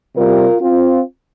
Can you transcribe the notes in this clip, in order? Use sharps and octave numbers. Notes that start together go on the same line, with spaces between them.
C3 G3 F4 A#4
C4 F4